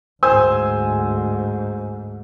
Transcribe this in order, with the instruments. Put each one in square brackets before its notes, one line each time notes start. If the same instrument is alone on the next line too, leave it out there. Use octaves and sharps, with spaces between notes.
[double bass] D2 G#2 [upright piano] C5 G#5 E6